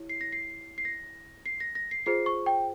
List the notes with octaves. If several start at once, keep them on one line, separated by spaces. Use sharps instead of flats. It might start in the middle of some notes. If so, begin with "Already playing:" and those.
Already playing: E4 G4 C#5
C7
A#6
C7
C7
A#6
C7
A#6
A#6
C7
F4 G#4 C5 C7
C#6
G5